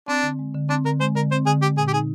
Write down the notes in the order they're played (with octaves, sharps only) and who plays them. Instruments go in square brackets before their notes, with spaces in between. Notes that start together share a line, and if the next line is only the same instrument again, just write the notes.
[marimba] C4 [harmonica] D4
[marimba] D3
G#3
D3
[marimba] C4 [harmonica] D4
[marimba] D3 [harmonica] A#4
[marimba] G#3 [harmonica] C5
[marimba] D3 [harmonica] A#4
[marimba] C4 [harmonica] C5
[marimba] D3 [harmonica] G#4
[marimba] G#3 [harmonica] G4
[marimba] A#2 [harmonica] G#4
[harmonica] G4
[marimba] D#4 [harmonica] G#4